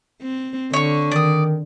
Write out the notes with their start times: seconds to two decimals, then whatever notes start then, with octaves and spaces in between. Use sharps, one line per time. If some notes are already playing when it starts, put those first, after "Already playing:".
0.22 C4
0.73 D3 C#5 C#6
1.11 D#3 D5 D#6